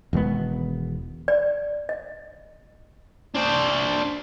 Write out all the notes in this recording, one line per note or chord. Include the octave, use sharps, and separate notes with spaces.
E1 D#3 G#3 B3
D5
D#5
D4 C5